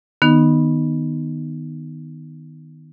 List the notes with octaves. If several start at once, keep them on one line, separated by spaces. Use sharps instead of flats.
D#3 B3 D#4